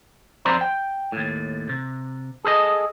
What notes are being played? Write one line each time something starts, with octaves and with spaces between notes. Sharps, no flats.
F2 C4 C5 D5 A#5 C6
G5
D#2 A2
C3
G#4 A4 C5 D#5